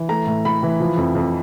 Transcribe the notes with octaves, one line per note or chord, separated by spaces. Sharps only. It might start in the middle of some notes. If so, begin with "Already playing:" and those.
Already playing: E3
A3 A#5
A2
A2 B5
E3
F3
F2
F2